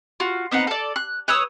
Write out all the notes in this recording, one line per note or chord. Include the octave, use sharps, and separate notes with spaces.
F4 F#4
B3 C4 D#4 F#5
A4 D5
F#6
B4 C#5 D#6 E6